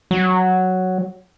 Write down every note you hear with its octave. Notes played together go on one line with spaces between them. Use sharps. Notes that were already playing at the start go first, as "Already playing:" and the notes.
F#3